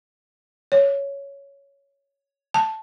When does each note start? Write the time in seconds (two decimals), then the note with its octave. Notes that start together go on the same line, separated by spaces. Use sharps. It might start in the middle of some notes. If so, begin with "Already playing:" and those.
0.72 C#5
2.54 A5